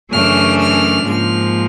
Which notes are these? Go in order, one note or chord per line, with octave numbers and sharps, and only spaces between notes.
F#2 C#3 E3 A3 D4 F6
F6
G#2 F3 A#3 F6